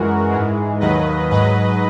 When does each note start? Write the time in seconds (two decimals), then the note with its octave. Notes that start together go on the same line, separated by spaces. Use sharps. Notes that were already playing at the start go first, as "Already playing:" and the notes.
Already playing: F#2 E3 G#3 F#4 A#4
0.30 G#2 E3 G#3
0.80 D#2 D#3 F#3 B4 D#5
1.31 G#2 F#3 B4 D#5